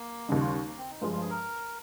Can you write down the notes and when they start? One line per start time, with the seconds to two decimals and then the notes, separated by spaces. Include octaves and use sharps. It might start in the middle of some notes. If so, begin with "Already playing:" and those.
Already playing: A#3
0.28 D#2 C#3 G3 G#3
0.40 F4
0.66 A#3
0.78 C4
0.90 D#4
1.01 G2 F3 G#3 F4
1.12 F4
1.21 G#4
1.30 A#4